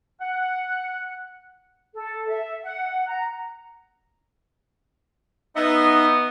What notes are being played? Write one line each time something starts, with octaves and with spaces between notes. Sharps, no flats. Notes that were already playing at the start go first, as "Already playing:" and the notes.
F#5
A4
E5
F#5
A#5
B3 D#4 D#5 E5